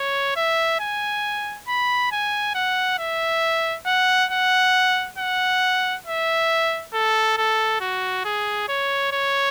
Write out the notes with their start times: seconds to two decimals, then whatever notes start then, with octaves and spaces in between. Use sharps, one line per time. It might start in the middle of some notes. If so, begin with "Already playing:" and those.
Already playing: C#5
0.36 E5
0.81 G#5
1.68 B5
2.12 G#5
2.55 F#5
2.99 E5
3.86 F#5
4.31 F#5
5.18 F#5
6.07 E5
6.94 A4
7.37 A4
7.81 F#4
8.25 G#4
8.69 C#5
9.13 C#5